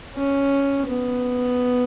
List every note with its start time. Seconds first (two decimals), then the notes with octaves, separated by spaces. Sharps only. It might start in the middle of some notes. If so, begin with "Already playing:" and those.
0.15 C#4
0.87 B3